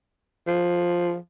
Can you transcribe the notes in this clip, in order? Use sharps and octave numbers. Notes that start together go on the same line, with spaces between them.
F3